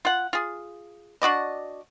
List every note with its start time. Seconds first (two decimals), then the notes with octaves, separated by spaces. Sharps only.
0.05 F4 F#5
0.33 F4 G#4
1.22 D4 F#4 D5 D#5